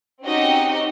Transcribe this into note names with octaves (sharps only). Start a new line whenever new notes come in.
C4 C#4 D#4 F#4 G4 D#5